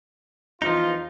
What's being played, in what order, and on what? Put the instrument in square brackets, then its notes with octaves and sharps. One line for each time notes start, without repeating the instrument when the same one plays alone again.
[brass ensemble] E2 F4 [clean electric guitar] F3 D#4